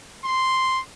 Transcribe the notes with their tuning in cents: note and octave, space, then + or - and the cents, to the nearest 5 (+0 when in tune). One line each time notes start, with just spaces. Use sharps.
C6 -5